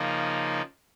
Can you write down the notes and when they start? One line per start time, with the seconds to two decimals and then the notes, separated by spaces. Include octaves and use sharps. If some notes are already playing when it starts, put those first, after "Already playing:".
Already playing: C#3 F3 A#3 D#4